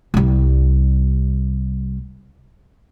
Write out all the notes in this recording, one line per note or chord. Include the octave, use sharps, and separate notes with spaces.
C2 G3